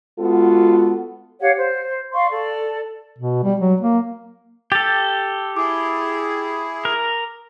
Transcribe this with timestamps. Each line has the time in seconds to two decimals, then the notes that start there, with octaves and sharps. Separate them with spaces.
0.19 G#3 B3 F4 F#4 A4
1.39 G4 C#5 F5 F#5
1.55 C5
2.11 D5 F5 C6 C#6
2.29 A4 D5
3.19 B2
3.44 G3
3.60 F#3
3.81 A#3
4.72 G4 A4 A6
5.56 E4 G#4 D6
6.85 A#4